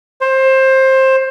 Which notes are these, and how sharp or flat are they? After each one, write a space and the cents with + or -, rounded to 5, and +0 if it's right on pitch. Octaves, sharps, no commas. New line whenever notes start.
C5 +20